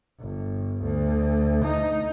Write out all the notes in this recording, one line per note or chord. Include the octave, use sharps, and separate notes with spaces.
G1
D2
D#4